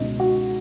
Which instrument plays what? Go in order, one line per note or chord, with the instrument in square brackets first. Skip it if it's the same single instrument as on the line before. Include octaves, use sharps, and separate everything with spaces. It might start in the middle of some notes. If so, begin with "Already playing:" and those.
Already playing: [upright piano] C#2 B2 D#4
F#4